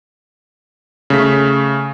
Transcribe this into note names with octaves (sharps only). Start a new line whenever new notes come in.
C#3 A3 B6